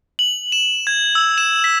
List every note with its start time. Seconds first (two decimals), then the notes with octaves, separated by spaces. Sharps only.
0.19 F#7
0.52 E7
0.87 G#6
1.15 E6
1.38 E7
1.64 B6